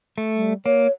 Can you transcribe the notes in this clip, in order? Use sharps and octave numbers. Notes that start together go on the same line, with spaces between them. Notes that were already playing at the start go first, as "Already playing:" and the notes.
A3
G3
A#3 C#5